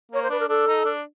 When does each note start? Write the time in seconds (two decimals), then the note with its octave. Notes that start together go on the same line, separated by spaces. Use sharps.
0.11 A#3 C#5
0.22 C5
0.29 D4 B4
0.40 A#4
0.48 D4 A4
0.67 D#4
0.85 D4